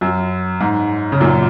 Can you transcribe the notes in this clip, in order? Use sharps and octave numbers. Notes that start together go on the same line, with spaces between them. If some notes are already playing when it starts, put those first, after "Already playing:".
F#2
G#2
C#3
F#2 A#2